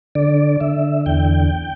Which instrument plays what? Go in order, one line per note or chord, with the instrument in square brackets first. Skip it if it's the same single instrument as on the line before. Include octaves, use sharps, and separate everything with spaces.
[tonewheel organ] D3 D5
D3 E5
E2 G5